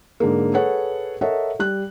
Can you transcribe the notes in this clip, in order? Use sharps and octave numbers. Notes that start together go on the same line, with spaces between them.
G#2 D3 G#3 A#3
G#4 A4 B4 C#5 F#5
A4 A#4 C#5 D#5 E5 F#5
G3 F#6